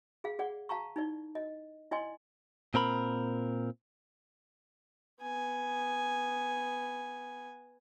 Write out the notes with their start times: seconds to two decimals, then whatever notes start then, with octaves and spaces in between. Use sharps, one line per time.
0.24 G#4 F5
0.39 G#4 D5 F#5
0.69 F5 A5 A#5 C#6
0.96 D#4 E4 D5
1.35 D#5
1.91 E4 D5 D#5 G#5 C6
2.74 A#2 C4 A#4 B5
5.22 B3 G#5